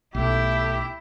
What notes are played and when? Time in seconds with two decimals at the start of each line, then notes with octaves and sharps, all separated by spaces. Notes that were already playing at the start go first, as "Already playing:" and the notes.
0.15 B1 A3 E4 G4 E5